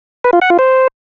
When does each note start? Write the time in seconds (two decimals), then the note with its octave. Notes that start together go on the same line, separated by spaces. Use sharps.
0.24 B4
0.33 F4
0.42 F#5
0.50 F4
0.59 C5